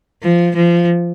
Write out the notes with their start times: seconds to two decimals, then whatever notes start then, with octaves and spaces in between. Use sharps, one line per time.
0.23 F3
0.56 F3